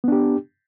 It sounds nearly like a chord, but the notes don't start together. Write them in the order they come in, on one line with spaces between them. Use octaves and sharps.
B3 D4 G4